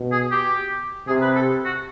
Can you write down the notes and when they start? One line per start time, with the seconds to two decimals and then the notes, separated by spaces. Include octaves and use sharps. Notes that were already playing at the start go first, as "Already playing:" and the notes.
Already playing: B2
0.12 G#4
0.31 G4
1.07 C3 G#4
1.22 B4
1.36 A4
1.65 F#4